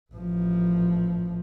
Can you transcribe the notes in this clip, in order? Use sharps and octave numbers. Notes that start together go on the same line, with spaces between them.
A1 F3